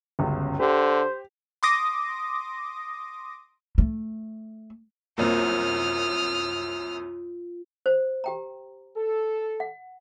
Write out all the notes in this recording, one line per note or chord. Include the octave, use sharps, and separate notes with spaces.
G1 C#2 F#2
D3 G4 C5
C6 D6 D#6 A#6
A3
C2 F#2 A#3 C4 F4 D#6 F6
C5
G4 G5 A#5
A4
F#5